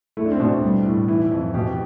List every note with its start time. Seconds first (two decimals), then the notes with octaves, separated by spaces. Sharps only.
0.17 A3 E4
0.25 D4
0.32 C4
0.39 B2 D4
0.63 G3
0.86 A2
1.08 E3 E4
1.31 F2
1.54 B2 G4